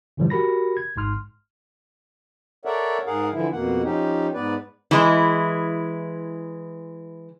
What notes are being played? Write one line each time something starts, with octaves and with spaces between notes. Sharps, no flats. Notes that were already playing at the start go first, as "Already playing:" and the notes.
G2 A#2 D3 E3 F3 G3
F#4 G4 A#4 B5 A#6
G#6
G#1 G#2 C6 F6
A4 A#4 C#5 D5 E5 F#5
G#2 G#4 A#4 F5 F#5
D3 E3 F3 E4
F2 B2 A#3 F#5
F3 C#4 D#4 G4
G#2 B3 B4 D5
E3 G#3 E4